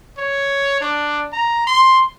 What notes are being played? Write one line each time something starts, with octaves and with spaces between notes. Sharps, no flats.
C#5
D4
A#5
C6